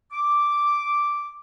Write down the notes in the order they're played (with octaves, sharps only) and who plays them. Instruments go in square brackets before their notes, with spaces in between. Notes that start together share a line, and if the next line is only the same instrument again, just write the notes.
[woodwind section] D6